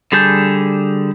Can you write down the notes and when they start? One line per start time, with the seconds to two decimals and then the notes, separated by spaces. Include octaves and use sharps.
0.12 D3 G3 G#4 A5 G6